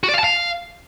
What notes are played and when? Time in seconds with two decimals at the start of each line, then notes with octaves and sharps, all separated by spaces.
0.03 F#4
0.09 D5
0.14 F5
0.19 A5
0.24 F5